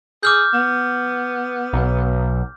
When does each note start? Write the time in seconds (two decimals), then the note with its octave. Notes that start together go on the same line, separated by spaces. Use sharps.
0.23 G#4 D6 F6 G6
0.54 B3
1.73 B1